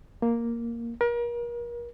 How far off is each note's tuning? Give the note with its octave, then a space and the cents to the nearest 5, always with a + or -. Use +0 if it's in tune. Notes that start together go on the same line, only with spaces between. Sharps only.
A#3 +0
A#4 +35